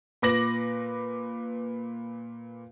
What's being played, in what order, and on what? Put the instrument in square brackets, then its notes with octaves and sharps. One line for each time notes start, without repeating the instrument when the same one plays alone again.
[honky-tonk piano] A#2 B4 D6 A#6 F#7